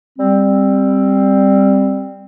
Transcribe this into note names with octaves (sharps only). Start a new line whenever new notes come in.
G3 C4